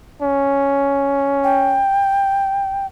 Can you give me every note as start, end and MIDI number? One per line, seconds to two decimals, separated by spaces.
0.22 1.85 61
1.44 2.86 79